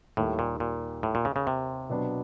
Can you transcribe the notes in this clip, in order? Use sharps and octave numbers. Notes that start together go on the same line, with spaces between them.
D#2 A2 D#3 G3 A#3
A#2
A#2
A2
A#2
C#3
C#3
C3
B2 F#3 B3 D4